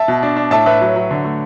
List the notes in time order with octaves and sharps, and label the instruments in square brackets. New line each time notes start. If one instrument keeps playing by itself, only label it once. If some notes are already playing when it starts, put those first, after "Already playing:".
Already playing: [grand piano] E5 A5
B2
D4
D4
A2 E5 A5
A2 B4 E5
F#3
F#3
D3
A3